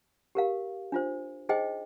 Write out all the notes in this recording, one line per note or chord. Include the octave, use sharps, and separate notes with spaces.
G4 A#4 F5
D4 F4 C5
D#4 G#4 C5 D#5 G5